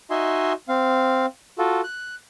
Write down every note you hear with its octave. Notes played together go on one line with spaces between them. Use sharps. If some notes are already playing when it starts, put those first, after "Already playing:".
D#4 F#4 D#5 E5 G#5 C6
C4 F5
F4 F#4 A4
F#6